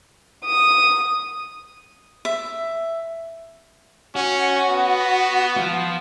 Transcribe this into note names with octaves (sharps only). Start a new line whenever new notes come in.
D#6
E5
C#4 F#4
B3
F3 F4